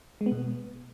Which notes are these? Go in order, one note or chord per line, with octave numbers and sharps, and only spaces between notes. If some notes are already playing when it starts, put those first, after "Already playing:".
G#3
B3
B2